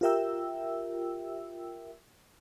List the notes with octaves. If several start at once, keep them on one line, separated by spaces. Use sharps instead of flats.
F4 G4 A#4 E5 G5 E6